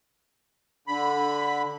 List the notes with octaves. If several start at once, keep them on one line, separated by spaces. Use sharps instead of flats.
D3 B5